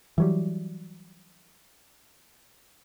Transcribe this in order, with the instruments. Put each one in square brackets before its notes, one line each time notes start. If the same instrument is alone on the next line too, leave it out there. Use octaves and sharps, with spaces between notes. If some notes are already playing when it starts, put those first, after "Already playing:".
[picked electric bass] E3 F#3 G3